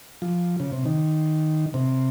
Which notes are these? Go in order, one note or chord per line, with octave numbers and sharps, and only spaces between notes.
F3
C#3
C3
D#3
C3